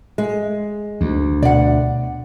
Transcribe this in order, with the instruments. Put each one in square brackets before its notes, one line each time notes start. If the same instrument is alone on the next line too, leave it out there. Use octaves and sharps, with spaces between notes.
[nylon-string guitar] G#3
[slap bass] D2
[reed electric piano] B2 [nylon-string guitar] D5 F#5